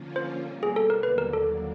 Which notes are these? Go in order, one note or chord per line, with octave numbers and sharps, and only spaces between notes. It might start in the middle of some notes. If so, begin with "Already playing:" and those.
Already playing: D3 F3 A#3 C#4 F4
C5
B2 G3 A#3
G#4
A4
A#4
D#2 D3 F#3 A#3 D4 B4
A#4
A4